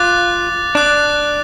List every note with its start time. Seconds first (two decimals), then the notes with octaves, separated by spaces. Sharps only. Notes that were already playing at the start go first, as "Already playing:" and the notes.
Already playing: F4 D6 F#6 A6
0.75 D4 D6 F#6 A6